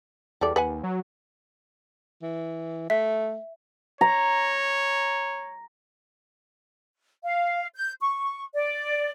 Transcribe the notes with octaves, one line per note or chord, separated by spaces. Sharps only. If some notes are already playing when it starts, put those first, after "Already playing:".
E2 G3 A4 D5
D#2 B4 F#5 G#5
F#3
E3
A3 E5
C#5 A#5
F5
G6
C#6
D5